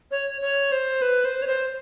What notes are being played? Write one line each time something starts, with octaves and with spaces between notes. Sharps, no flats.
C#5
C#5
C5
B4
C5
C#5
C5